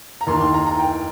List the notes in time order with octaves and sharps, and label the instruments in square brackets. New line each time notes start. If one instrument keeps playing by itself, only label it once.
[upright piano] A#5
D#2 D#3 C6
C6
A#5
A#5
G5